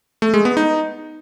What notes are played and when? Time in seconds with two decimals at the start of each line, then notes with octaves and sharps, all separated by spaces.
0.22 A3
0.34 G#3
0.45 B3
0.57 D#4